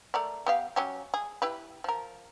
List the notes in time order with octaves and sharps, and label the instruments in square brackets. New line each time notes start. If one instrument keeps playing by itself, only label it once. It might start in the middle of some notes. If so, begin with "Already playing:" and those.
[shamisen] A3 A#4 D5
B3 G4 F5
F#3 C#4 G4
G#4
E4 G4 B4
F3 A#4